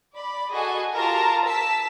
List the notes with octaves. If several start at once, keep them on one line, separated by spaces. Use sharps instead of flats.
D5 B5
F#4 G#4 A4 D#5 G#5
F4 G4 A#4 A5 A#5
A5 E6 B6